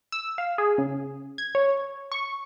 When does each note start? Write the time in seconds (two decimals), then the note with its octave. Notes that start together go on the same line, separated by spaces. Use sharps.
0.12 E6
0.38 F5
0.58 G#4
0.78 C#3
1.38 G#6
1.55 C#5
2.12 C#6